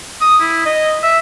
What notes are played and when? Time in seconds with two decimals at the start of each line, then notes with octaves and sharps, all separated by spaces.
0.21 D#6
0.40 E4
0.66 D#5
1.03 E5